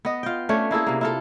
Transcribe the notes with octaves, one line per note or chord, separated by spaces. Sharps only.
B3 D#5
F4 G5
A3 C#4 D4 C#5
A#3 E4 G#4 A4
C3 A#3
E4 F4 A4